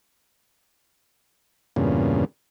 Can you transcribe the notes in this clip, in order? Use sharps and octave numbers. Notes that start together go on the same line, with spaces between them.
E2 G2 A#2 C#3